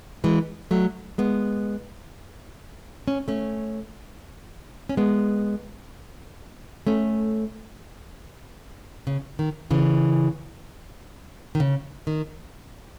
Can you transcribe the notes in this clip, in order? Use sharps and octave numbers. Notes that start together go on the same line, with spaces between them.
E3 G#3
F#3 A3
G#3 B3
C#4
A3 C#4
C#4
G#3 B3
A3 C#4
C#3
D#3
C#3 E3
D#3
C#3
D#3